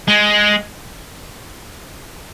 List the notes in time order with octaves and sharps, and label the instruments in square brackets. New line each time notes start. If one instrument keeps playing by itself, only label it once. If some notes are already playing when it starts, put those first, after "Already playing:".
[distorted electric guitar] G#3